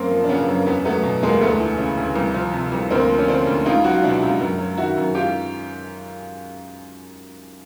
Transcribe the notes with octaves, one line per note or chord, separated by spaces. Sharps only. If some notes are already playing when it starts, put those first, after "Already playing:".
Already playing: F#2 A#3 C4
F3
D4
C#3 B3 C#4
F#2
E2 B3 C#4
F#3 A3 B3
B2
E2 G#3 A#3
D2 A3 B3
E3
C#3
D2
C2
F3
C3
C2
D2 A#3 C4
F3
C#4
D3 C4 D4
D2
C#2 D#4 F4
F#3 F#4
F4
B2 D4 E4
C#2
F#2
F#3
D#3 E4 F#4
F#2
G#2 F4 G4